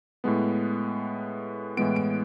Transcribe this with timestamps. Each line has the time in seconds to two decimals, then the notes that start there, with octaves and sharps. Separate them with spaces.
0.24 A2 G#3 B3
1.77 A2 E3 G#3 B3 D7
1.96 D7